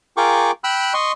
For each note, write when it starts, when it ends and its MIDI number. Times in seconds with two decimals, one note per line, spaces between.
0.17 0.51 65
0.17 0.51 68
0.17 0.51 70
0.17 0.51 79
0.17 0.51 85
0.17 0.51 86
0.64 0.93 79
0.64 0.93 83
0.64 0.93 88
0.64 0.93 90
0.94 1.12 75
0.94 1.12 84
0.94 1.12 85